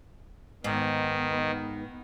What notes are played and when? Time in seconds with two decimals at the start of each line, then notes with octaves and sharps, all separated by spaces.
0.64 G#2 D#3 B3